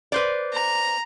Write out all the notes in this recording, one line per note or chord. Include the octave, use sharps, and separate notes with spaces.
B4 C5 D5
A#5